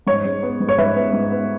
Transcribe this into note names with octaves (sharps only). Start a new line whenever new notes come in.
G#2 C#5
G#3
B3
G#2
C#5
G#2 B4 E5
B3
G#2
B3